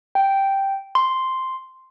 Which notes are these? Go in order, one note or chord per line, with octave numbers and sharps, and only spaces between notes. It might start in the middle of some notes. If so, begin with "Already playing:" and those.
G5
C6